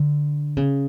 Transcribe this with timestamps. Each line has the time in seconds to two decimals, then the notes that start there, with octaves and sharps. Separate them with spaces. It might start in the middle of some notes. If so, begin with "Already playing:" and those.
Already playing: D3
0.57 C#3